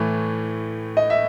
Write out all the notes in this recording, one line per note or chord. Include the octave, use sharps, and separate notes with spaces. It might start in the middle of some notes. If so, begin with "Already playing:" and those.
Already playing: A2 E3 A3
D#5
E5